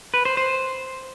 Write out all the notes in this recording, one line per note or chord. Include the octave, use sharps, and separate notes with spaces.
B4
C5
C5